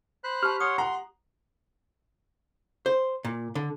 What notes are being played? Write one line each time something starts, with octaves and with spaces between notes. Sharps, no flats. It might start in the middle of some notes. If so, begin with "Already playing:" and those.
C5 B5 F#6
G4 A5 F6
C#5 F#5 C6 D#6
F#5 A#5 C6
C5
A#2
D3